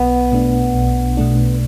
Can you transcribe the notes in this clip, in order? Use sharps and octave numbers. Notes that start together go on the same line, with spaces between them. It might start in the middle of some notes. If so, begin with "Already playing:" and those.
Already playing: B1 B3
B2 A3 D4
B1
B2 A3 D4